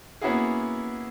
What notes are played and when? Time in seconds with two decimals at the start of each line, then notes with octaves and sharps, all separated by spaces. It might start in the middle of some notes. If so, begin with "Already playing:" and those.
0.21 A#3 B3 C#4 E4 F#4 G#4